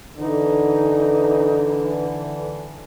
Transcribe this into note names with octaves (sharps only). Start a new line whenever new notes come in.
D3 E3 D#4